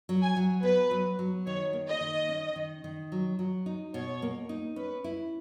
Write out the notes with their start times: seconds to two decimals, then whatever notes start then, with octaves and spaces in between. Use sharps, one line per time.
0.09 F#3
0.22 G#5
0.37 F#3
0.63 B3 B4
0.91 F#3
1.19 F#3
1.46 D#3 C#5
1.73 A#3
1.88 D#5
2.01 D#3
2.29 C#4
2.56 D#3
2.84 D#3
3.12 F#3
3.39 F#3
3.66 D#4
3.94 B2 C#5
4.22 A#3
4.49 D#4
4.76 C#4 B4
5.04 E4